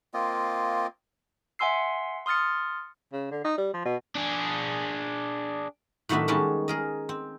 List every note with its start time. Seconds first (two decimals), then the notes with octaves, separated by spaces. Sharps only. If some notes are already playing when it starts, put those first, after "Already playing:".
0.14 A#3 C4 F4 D#5
1.59 E5 F#5 G#5 C6 E6 C7
2.26 C6 D#6 F6 A6 C#7
3.13 C#3
3.31 D3
3.44 D#4
3.58 G3
3.74 F3
3.85 B2
4.16 D4 G#4
6.09 A2 D#3 F#3 B3 D4 E5
6.28 D#3 G3 G#3 C#4 A5
6.68 G#4 A#4 D#5
7.09 C4